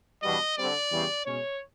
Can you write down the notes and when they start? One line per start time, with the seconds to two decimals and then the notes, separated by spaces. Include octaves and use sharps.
0.23 E2 B2 G3 B3 D4 D#5
0.57 D3 G3 C4 D5
0.91 E2 C#3 E3 G3 C4
1.25 B2 G#3 C#4 C#5